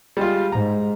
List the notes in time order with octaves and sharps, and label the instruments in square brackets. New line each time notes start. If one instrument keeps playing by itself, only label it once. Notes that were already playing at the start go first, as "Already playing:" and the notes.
[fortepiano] G3 G#3 F4
[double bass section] G#2 [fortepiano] A#5